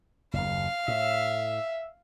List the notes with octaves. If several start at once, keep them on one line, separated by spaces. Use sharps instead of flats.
F#1 D#2 F5
A2 E5